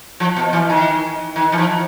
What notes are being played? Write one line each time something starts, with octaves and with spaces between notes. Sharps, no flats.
F3
B2
E3
D#3
D#3
E3
F3